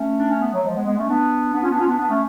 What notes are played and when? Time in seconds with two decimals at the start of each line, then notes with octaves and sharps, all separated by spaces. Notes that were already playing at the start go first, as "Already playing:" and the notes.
Already playing: A3 C#4
0.19 D4
0.31 C#4
0.42 B3
0.53 F#3 A3
0.64 F3 G#3
0.75 G#3 B3
0.86 G#3 B3
0.97 A3 C#4
1.09 B3 D4
1.54 B3 D4
1.62 C#4 F4
1.70 B3 D4
1.79 C#4 F4
1.87 B3 D4
1.98 B3 D4
2.09 A3 C#4